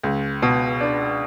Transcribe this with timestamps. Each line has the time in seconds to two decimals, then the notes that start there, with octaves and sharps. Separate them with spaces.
0.03 C#2
0.42 B2
0.81 D4